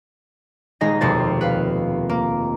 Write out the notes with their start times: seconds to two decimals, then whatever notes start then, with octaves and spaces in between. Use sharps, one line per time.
0.81 D#1 G#3 D#4 G#4 D#5 A#6
1.01 F1 D#2 B2 C5 A6
1.41 B4 F5
2.09 A#3